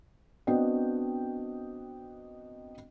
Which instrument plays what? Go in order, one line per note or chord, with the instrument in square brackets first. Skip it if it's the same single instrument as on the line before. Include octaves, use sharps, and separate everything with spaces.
[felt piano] B3 C4 D4 F#4 D#5 G5